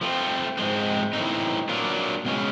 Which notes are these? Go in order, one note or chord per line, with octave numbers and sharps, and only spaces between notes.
F3 A3 C4 F4
G#2 F3 G#3 C4
A2 E3 A3 C4 D#4
F#3 A#3 D4 F4
B2 G#3 C#4